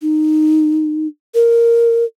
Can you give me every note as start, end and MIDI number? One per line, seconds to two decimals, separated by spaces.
0.02 1.07 63
1.35 2.05 70